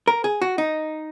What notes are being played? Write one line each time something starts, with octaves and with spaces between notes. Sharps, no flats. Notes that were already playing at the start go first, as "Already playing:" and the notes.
A#4
G#4
F#4
D#4